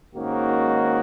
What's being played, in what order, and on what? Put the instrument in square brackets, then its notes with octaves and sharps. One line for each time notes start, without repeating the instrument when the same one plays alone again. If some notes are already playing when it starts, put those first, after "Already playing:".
[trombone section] G#2 D#3 A#3 C#4 F#4